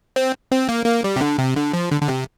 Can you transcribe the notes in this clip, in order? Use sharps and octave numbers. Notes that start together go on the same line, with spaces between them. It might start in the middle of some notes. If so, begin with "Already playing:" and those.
C4
C4
A#3
A#3
G3
C3
D3
C3
D3
F3
D3
D3
C3